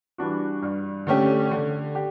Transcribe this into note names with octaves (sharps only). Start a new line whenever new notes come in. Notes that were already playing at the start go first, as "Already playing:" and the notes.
E3 G3 D4 F#4
G2
D3 A3 C#4 G4
D3
G4